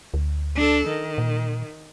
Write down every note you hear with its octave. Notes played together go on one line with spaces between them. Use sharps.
D2
D4 A4
D#3
A#2